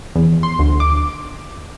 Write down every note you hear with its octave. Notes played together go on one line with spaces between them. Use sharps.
E2
C6
D2
D6